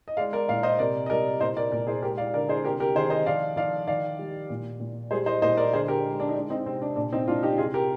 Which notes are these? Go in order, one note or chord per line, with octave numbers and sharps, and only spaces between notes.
D#5
G#3 D5 F5
A#4 D5
A#2 D5 F5
C5 D#5
C3 A#4 D5
D#5
G3 A#4 D5
A#2 C5 D#5
A#4 D5
A#2 A#4 D5
G#4 C5
G#3 G4 A#4
D5 F5
D3 A#4 D5
G#4 C5
C3 G4 A#4
G4 A#4
D#3 G#4 C5
C5 D#5
F3 D5 F5
F3 D5 F5
D#3 D5 F5
G3
A#2
A#2
G3 G#4 C5
C5 D#5
A#2 C5 D#5
A#4 D5
D3 G#4 C5
G4 A#4
G#3
D4
D#4
G#3 D4
C4 D#4
C3 C4 D#4
D4
A#2 D4
C4 D#4
A#2 D4 F4
D#4 G4
C3 F4 G#4
G4 A#4